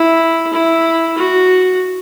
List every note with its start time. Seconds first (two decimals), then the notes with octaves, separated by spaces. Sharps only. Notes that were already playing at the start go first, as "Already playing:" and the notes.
Already playing: E4
0.53 E4
1.18 F#4